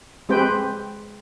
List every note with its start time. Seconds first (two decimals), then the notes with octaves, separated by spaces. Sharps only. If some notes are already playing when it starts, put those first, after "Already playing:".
0.29 G#3 C4 G4 B4 C5 G5